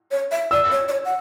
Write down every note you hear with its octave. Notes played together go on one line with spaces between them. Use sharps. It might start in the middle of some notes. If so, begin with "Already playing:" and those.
C#5
E5
D5 E6
C#5
D5
C#5
F#5